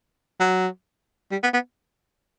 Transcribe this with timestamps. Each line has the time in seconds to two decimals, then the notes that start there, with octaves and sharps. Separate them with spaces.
0.40 F#3
1.31 G3
1.43 B3
1.53 B3